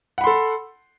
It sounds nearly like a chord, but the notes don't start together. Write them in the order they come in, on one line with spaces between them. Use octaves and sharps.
F#5 B5 C6 A4